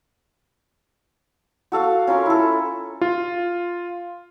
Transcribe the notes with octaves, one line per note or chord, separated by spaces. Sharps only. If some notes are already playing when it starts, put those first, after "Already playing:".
F#4 A4 F5
C#4 F4 A#4 C6
E4 A4
F4